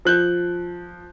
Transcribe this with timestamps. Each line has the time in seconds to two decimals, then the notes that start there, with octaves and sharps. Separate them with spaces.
0.05 F3 F#6 G6